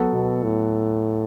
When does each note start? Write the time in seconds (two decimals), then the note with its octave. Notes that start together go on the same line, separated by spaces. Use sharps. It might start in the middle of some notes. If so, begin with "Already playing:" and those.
Already playing: F#3 B3 F#4 A4
0.13 B2
0.43 A2